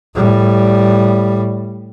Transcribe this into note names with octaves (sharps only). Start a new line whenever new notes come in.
A2 G3